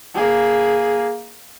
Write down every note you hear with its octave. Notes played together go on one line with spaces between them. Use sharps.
A#3 G#4